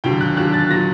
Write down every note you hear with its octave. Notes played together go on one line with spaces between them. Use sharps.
D#2 D3 F#3 G5
F#6
D#2 D3 F#3 F#6
A6
A#2 F#3 A#6